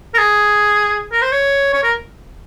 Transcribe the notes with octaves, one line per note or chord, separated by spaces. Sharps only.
A#4
G#4
A#4
C5
C#5
C#5
A#4